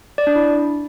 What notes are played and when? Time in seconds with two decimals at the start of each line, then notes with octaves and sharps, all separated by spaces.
0.18 D5
0.27 D4
0.35 E4